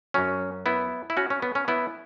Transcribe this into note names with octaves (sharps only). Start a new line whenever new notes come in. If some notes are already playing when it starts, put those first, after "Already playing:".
F#2 F#3 C#4
B3 E4
E4
C#4 F#4
C#4
B3
C#4
B3 E4